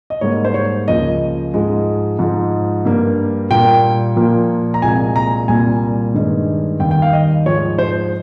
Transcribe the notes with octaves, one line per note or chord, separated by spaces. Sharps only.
D#5
G#2 G3 A#3 C#5
C5
C#5
C#2 C#3 F3 A#3 D#5
G#2 F3 G#3
G#2 F3 G#3
G2 G3 A#3
A#2 G3 A#3 G5
A#2 F3 A#3
A#5
C2 A#2 G#3 G#5
A#5
C2 A#2 G3 A#3 G#5
G2 D#3 G#3
D#2 D#3 G3 G5
G5
F5
D#5
G#2 F3 G#3 C#5
C5